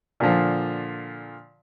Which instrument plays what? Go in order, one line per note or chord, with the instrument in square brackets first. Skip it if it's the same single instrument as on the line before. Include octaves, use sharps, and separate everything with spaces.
[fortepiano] A#2 D3 F3